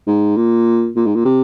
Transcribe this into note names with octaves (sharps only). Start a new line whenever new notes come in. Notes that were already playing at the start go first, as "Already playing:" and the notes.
G#2
A#2
A#2
G#2
A#2
C3